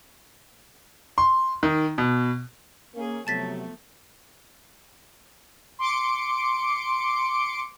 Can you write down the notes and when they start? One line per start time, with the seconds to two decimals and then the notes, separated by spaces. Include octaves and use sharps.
1.18 C6
1.63 D#3
1.98 B2
2.95 A#3 C#4 G#4
3.27 C3 F3 F#3 A3 B3 A5 A6 B6
5.79 C6 D6 C#7 D7